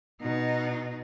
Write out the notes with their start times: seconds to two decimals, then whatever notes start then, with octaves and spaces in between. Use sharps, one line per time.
0.21 B2 D#4